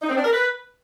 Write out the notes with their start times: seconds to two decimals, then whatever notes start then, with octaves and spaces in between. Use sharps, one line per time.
0.02 D#4
0.09 C4
0.17 D4
0.24 A#4
0.31 B4